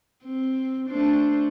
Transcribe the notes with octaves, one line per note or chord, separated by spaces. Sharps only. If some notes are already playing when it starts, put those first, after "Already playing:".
C4
A3 D4 C5